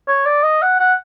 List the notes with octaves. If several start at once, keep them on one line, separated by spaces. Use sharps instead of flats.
C#5
D5
D#5
F#5
F#5